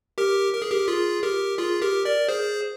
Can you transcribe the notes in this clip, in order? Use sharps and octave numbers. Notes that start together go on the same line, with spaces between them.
G4 A#4
A#4
G#4
G4 A#4
F4 G#4
G4 A#4
F4 G#4
G4 A#4
A#4 D5
G#4 C5